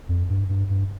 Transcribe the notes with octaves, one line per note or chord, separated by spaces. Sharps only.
F2
G2
G2
G2